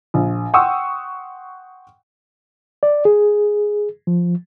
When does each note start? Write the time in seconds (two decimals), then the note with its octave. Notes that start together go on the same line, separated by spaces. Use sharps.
0.14 A#1
0.54 F#5 G5 C6 C#6 D#6 E6
2.83 D5
3.05 G#4
4.07 F3